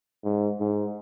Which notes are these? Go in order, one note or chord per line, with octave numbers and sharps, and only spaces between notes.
G#2
G#2